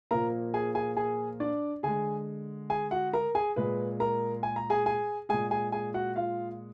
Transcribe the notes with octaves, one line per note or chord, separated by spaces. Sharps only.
A#2 F3 A#3 A#4 A#5
G#4 G#5
G#4 G#5
G#4 G#5
D4 D5
D3 G#3 G#4 G#5
G#4 G#5
F#4 F#5
A#4 A#5
G#4 G#5
A#2 G#3 B4
A#4 A#5
G#5
A#5
G#4 G#5
G#4 G#5
A#2 G#3 G#4 G#5
G#4 G#5
G#4 G#5
F#4 F#5
F4 F5